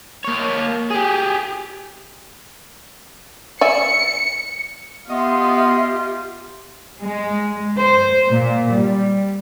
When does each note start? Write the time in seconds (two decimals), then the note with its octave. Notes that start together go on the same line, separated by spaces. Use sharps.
0.24 A#3 C#5
0.91 G4 G#4
3.61 D5 E5 G#5 C#7
5.10 B3 F4 G4 D#5 E5 C6
7.00 G#3
7.78 C5
8.28 A#2
8.71 G3